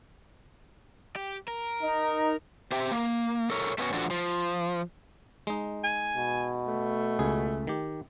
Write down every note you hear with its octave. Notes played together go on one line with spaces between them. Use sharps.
G4
A#4
D#4
C4 G4 C5 E5 G5
A#3
A4 A#4 C#5
A3 B3 C#4 F#4
D3 F3 D4 F#4
F3
G#3 D#4
G#5
B2
A3
C#2 G#4
D#3 G4